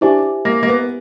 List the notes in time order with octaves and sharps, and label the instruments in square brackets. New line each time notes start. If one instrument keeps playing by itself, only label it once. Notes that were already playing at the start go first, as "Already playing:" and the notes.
[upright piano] D4 [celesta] E4 G4 C5 E5 G#5
[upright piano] A#3
A#3
B3